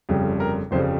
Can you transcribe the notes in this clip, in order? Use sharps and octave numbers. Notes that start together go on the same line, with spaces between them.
G1 F2 C#3 G3
A#4
G1 F2 C#3 G3 C5